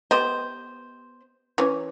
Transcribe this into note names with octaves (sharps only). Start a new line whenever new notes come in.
B3 G4 C5 D#5
E3 C#4